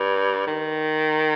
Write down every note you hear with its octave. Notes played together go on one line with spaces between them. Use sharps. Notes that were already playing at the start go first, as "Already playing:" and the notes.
Already playing: G2
D#3